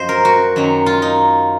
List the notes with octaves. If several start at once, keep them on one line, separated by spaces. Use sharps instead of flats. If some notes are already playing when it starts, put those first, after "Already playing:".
Already playing: F#2 F3 C5 D#5
A#4
F#4
F#2 D#3 F#3
F4
D#4